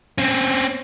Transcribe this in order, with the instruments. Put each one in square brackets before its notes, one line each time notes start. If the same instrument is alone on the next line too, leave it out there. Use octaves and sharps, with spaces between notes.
[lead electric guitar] C4 C#4